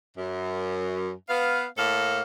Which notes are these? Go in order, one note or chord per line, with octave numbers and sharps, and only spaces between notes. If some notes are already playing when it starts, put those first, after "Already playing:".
F#2
B3 F5
A2 A#3 A4 F5